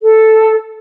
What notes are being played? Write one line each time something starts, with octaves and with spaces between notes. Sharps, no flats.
A4